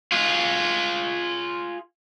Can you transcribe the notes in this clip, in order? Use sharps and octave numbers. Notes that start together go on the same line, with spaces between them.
F4 G#4